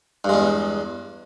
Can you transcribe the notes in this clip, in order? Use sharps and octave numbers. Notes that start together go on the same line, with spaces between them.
E2 G2 G#3